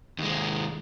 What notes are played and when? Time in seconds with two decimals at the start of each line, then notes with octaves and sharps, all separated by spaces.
0.18 D#2 G#3